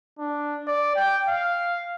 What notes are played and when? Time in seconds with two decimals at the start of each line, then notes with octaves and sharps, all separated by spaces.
0.19 D4
0.67 D5
0.96 G5
1.28 F5